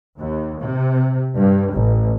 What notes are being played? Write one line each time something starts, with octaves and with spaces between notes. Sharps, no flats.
D#2
C3
G2
A1